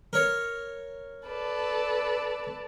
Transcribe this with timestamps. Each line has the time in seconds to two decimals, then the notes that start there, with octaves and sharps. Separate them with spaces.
0.13 A#4 C#5
1.27 A4 B4 D5 A5